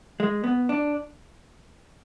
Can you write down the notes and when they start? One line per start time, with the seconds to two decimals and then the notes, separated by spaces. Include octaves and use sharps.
0.20 G#3
0.44 B3
0.69 D4